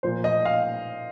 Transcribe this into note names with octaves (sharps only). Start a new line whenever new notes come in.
A#2 F3 A#3 C5
D#5
F5